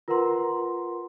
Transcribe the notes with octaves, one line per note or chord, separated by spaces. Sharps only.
F4 A#4 B4 F#5 A#5 C6